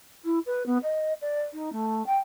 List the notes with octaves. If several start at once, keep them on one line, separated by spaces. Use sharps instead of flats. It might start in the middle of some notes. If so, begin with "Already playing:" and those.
E4
B4
B3
D#5
D5
D#4
A3
G5